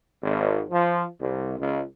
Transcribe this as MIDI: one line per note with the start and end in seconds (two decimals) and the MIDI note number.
0.22 0.61 32
0.70 1.04 53
1.20 1.54 36
1.58 1.81 37